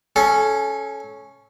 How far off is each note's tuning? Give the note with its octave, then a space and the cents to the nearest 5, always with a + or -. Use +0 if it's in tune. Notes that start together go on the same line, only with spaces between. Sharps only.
C#4 +0 A4 -25